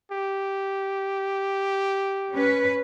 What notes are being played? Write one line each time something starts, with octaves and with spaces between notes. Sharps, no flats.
G4
C#4 B4